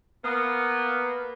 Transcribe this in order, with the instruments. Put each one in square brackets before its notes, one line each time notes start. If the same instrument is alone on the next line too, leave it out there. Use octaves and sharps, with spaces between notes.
[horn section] A#3 B3